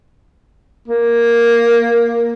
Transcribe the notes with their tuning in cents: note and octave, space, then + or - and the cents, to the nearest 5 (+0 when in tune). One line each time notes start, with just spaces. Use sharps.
A#3 +5